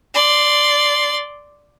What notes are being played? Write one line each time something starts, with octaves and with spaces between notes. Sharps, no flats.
D5 C6